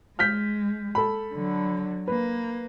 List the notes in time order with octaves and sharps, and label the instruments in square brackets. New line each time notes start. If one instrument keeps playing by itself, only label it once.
[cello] G#3 [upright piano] F6 G6 B6
[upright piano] A4 B5
[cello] D3 F#3
[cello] A#3 [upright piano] B4